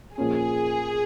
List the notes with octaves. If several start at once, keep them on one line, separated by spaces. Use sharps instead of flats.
A#2 F3 A#3 C#4 G#4